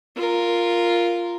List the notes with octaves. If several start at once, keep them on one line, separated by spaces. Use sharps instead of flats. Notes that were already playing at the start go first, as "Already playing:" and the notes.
F4 A#4